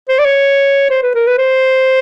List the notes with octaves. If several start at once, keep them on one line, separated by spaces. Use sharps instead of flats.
C5
D5
C#5
C5
B4
A#4
B4
C5